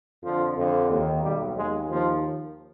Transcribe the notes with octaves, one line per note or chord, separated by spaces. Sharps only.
F2 D3 F3
F2 D3
D#2 D#3
B1 B2 G3
D#2 D#3 G#3
D#2 D#3 F3